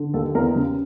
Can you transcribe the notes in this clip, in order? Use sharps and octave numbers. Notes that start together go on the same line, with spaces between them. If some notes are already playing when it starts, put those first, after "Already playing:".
Already playing: D3
D#2 A4
E2 A#4
C#3